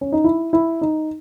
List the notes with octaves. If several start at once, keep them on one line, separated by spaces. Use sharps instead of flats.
C#4
D#4
E4
E4
D#4